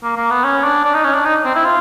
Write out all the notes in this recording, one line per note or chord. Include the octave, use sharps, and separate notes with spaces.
A#3
A#3
B3
C#4
D4
D4
D#4
C#4
D4
D#4
C4
E4
F4